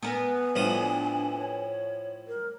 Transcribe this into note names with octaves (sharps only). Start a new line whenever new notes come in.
B3 A#4 G#5
A2 F3 D4 D#6
C#5
A#4